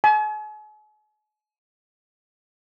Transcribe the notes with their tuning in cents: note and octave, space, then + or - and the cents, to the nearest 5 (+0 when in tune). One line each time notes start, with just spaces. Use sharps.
G#5 +45